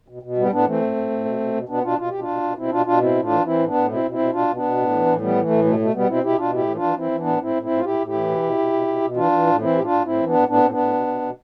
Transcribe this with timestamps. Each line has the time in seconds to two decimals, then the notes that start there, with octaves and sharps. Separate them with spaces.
0.08 B2
0.23 B2
0.37 A2 G3 B3
0.51 A2 B3 D4
0.66 E3 A3 C4
0.81 A2
0.96 A2
1.11 A2
1.25 B2
1.40 B2
1.54 B2
1.69 B2 B3 D4
1.83 B2 D4 F4
1.98 B2 F4
2.10 B2 G4
2.20 D4 F4
2.28 B2
2.42 B2
2.57 B2 C4 E4
2.71 B2 D4 F4
2.86 B2 D4 F4
3.01 A2 C4 E4
3.15 A2
3.23 D4 F4
3.30 E3
3.45 E3 C4 E4
3.59 A2
3.67 B3 D4
3.74 A2
3.88 B2 C4 E4
4.03 B2
4.11 C4 E4
4.19 B2
4.33 B2 D4 F4
4.48 B2
4.54 B3 D4
4.63 B2
4.76 A2
4.91 E3
5.06 A2
5.21 E3 G3 B3
5.36 E3
5.43 A3
5.50 A2
5.64 B2 A3
5.79 B2 A3
5.94 B2 G3 B3
6.09 B2 C4 E4
6.23 B2 E4 G4
6.38 B2 D4 F4
6.52 A2 E4 G4
6.68 E3
6.75 D4 F4
6.82 E3
6.96 E3 C4 E4
7.11 E3
7.19 B3 D4
7.26 A2
7.41 A2 C4 E4
7.55 A2
7.62 C4 E4
7.70 A2
7.77 F4
7.84 A2 E4 G4
7.99 A2
8.07 E4 G4
8.13 E3
8.29 B2
8.43 B2
8.58 B2
8.73 B2
8.87 B2
9.02 B2
9.16 E3 D4 F4
9.32 E3
9.46 A2
9.60 E3 C4 E4
9.75 A2 G4
9.83 D4 F4
9.90 A2
10.05 A2 C4 E4
10.19 E3
10.26 B3 D4
10.34 A2
10.48 A2 B3 D4
10.63 A2 C4
10.70 B3 D4
10.77 A2
10.93 B2
11.07 B2
11.22 B2